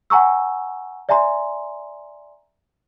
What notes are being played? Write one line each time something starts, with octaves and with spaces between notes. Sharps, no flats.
F#5 G#5 A#5 C#6 E6
D5 E5 G#5 A#5 C6